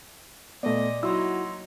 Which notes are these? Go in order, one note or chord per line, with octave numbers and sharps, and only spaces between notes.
A#2 A3 B3 D5 D#5
F#3 A#3 D#4 E4 F#4 C6 E6